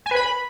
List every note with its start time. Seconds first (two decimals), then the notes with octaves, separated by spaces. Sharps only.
0.06 G#5
0.11 B4
0.16 B5